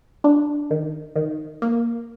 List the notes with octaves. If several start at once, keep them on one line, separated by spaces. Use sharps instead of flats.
D4
D#3
D#3
A#3